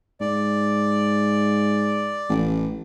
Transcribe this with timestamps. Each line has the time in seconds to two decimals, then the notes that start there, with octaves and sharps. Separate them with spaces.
0.21 G#2 D5
2.29 A1